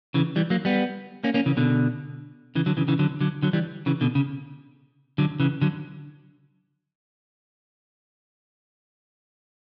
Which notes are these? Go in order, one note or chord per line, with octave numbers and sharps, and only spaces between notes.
C#3 E3
E3 G3
F#3 A#3
G3 B3
A#3 C#4
A#3 C#4
C#3 E3
B2 D3
C#3 E3
D3 F#3
C#3 E3
C#3 E3
D3 F#3
D3 F#3
D3 F#3
E3 G3
C#3 E3
B2 D3
C#3
D3 F#3
C#3 E3
D3 F#3